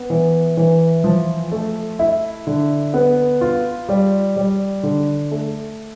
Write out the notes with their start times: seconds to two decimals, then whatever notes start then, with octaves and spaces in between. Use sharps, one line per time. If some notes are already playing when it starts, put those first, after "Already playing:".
Already playing: B3
0.10 E3
0.57 E3
1.04 F3
1.52 A3
1.99 E4
2.47 D3
2.94 B3
3.41 F4
3.89 G3
4.36 G3
4.83 D3
5.31 A3